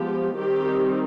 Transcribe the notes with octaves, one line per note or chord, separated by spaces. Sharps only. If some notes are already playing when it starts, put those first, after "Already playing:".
Already playing: F3 G#3 B3 G4
D#3 G3 C4 D#4 G4